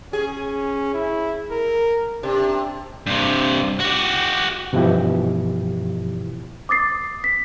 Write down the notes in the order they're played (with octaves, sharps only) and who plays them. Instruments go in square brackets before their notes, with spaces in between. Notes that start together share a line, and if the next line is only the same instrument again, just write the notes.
[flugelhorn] C#4 [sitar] G#4
[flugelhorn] E4
A#4
[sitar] C3 [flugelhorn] D4
[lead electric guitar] G2 C3
F#4 G4
[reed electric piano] G2 B2 E3 F3 E4 G4
[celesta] D6 D#6 A6 C7
B6